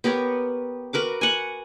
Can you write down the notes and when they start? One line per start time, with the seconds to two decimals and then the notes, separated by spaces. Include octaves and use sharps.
0.04 B3 G4 A#4 C#5
0.93 F#4 A#4 B4 D6
1.21 F#5 G#5